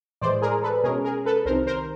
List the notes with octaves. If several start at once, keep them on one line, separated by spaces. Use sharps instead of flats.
A2 E3 G#3 C5 D5
G#4 A#4
A4 B4
B2 G#3 C#4 G#4 A#4
G#4 A#4
A4 B4
C2 C3 D#3 A#4 C5
A#4 C5